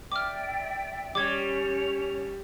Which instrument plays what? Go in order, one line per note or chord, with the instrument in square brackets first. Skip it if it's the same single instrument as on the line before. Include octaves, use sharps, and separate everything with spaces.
[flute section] D5 E5 G5 [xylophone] D6 F6
[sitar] G3 [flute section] C#4 C#5 [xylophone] D6 G#6